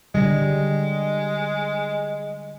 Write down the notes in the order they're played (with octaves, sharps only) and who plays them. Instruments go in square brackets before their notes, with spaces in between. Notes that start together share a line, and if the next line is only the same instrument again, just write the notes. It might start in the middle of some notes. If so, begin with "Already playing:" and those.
[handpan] D3 G3 [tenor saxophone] G#3